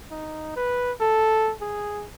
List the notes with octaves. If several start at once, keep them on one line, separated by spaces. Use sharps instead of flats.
D#4
B4
A4
G#4